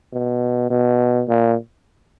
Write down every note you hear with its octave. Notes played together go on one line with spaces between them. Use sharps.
B2
B2
A#2